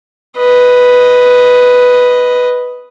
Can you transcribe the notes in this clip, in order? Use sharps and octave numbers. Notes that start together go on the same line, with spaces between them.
B4 D#5